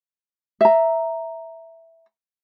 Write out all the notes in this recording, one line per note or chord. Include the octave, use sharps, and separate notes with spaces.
E5 A#5